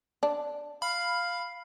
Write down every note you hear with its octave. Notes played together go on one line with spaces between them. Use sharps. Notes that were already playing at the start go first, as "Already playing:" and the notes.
D4
F5 B5